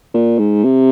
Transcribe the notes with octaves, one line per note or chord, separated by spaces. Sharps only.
A#2
G#2
C3